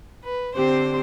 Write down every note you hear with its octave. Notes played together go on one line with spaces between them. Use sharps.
B4
D3 C4 G4 C5 C6